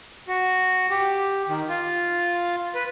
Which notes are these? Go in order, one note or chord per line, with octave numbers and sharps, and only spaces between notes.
F#4
G4
D#3
F4
B4